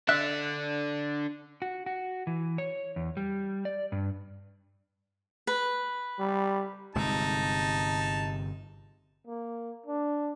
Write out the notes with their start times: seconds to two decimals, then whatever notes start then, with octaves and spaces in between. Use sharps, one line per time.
0.09 D3 D4 E5 F#6
1.62 F#4
1.86 F#4
2.27 E3
2.58 C#5
2.96 E2
3.17 G3
3.65 D5
3.92 G2
5.47 B4
6.19 G3
6.95 G1 C3 G#3 D#4 A5
9.27 A#3
9.86 D4